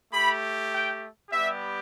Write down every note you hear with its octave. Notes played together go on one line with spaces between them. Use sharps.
A3 G4 B5
G5
G3 B3 G4 E5